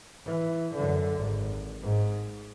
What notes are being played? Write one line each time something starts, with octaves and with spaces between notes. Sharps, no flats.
E3
F#2 D3
G#1
G#2